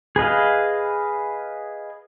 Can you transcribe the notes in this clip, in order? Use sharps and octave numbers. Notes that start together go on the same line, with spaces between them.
G#4 B4 D#5 F5